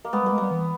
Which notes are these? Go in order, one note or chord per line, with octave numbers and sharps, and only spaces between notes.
A#3
G#3 B3
G3
A#3
G#3
G3 B3
E3